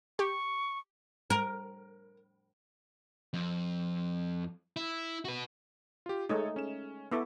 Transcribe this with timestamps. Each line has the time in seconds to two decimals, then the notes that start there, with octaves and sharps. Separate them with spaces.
0.19 G4 C#6
1.30 A#4
3.34 F2
4.76 E4
5.25 F#4 B4
6.06 F4 G4
6.29 G#3 A3 D#4 A4 C#5 D#6
6.56 C#4 E7
7.12 B3 E4 A4 C#6 D6 E6